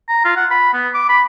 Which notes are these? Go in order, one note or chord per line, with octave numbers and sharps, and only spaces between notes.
A#5
F4
F#5
B5
B3
D6
B5